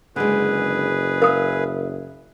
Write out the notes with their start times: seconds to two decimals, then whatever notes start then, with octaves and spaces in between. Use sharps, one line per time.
0.16 F#1 D3 G#3 G#4 B4
1.22 A#4 E5 F5 D#6